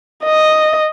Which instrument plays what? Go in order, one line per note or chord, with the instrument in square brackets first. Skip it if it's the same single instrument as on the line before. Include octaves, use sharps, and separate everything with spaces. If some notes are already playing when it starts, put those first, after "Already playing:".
[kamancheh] D#5